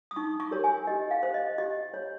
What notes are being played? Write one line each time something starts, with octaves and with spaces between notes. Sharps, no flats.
D#6
D#4 C#6
C#6
G4 A#4 C#5
G#5
G4 D#5
F5
C5
D#5
G4 D#5
C#5